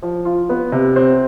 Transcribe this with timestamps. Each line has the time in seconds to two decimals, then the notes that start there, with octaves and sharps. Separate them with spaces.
0.02 F3
0.25 F4
0.49 B3
0.72 C3
0.96 C4